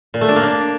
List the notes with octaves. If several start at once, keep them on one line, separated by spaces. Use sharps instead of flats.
A#2
A3
D4
A#3
D4